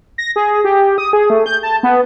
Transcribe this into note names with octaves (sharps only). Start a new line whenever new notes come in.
A#6
G#4
G4
D#6
G#4
A3
G6
A5
B3